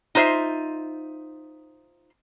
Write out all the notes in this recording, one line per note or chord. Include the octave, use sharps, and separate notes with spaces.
D#4 F4 C5 E5